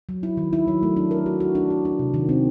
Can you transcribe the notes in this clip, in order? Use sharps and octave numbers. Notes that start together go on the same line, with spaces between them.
F#3
E4
D#3
E4
F#3
A3
D4
A#4
F#4
F#4
D4
F#4
D4
C3
D#3
C4